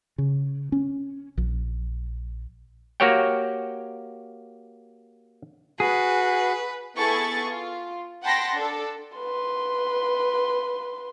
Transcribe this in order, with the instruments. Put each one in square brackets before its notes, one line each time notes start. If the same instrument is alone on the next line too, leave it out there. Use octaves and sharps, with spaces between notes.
[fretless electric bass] C#3
C#4
A#1
[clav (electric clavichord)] A#3 F#4 G4 C#5 F#5 G5
[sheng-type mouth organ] F#4 [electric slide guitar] G#4 [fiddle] B4
[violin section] B3 E4 G#4 A4 C#6 A6
F4
F#5 G5 A5 B5 C6 A#6
D4 A4
[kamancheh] B4 C6